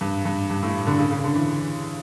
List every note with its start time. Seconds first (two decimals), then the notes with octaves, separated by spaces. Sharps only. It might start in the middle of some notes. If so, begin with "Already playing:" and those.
0.01 G2
0.25 G2
0.50 G2
0.63 A2
0.87 D3
0.99 C#3
1.11 C#3
1.24 D3
1.35 E3